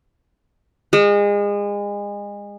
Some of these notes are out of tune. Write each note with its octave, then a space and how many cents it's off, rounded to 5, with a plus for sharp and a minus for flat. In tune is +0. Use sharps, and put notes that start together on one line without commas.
G#3 -30